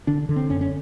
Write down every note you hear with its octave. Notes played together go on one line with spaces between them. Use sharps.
D3 D4
D3
C4
F#2 C#4
C#4